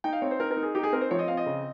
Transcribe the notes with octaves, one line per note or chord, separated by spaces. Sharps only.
D#4 G5
F5
C4 C#5
C5
D#4 A#4
A#4
D#4
G#4
D#4 G4
G#4
C4 A#4
C5
F3 C#5
D#5
C4 F5
D#5
C#3